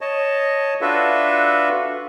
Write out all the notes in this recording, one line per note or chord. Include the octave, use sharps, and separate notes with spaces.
C#5 D#5 A5
D4 F4 F#4 A4 B4 E5